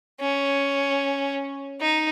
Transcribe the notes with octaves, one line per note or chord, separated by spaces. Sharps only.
C#4
D#4